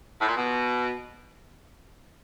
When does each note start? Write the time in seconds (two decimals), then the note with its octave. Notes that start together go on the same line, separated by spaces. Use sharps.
0.20 A2
0.28 A#2
0.36 B2